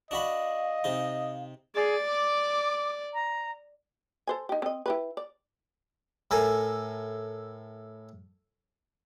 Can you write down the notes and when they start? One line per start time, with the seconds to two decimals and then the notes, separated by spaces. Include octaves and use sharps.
0.11 D4 F#4 D#5 F5 B5
0.84 C3 D#4
1.75 G#4 D5
2.06 D6
3.14 A#5
4.27 A4 C5 G#5
4.49 D#4 G4
4.62 C4 D#5
4.86 E4 G4 B4
5.17 D5
6.31 A2 A4 A#4 G#5